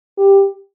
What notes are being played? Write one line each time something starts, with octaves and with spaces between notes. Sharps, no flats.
G4